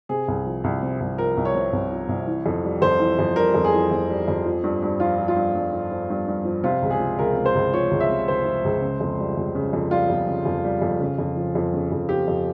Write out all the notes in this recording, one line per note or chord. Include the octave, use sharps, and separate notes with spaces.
C3 G#4
C2
F3
C2
C3
C2
F3 A#4
C2
C#5
C3
C2
F3
C2
E3
F2
G3
F2 C5
E3
F2
G3 A#4
F2
G#4
E3
F2
G3
F2
F3
G2
G2
F3 F4
F3
F4
G2
G2
F3
F3
G2
G2
F3
C3 F4
C#2
G#4
F3
C#2 A#4
C3
C5
C#2
F3 C#5
C#2
E5
C3
C#2 C5
F3
C#2
C#3
F2
G3
F2
C#3
F2
G3 F4
F2
C#3
F2
G3
F2
C#3
F2
F3
F2
C#3
F2
F3 G4
F2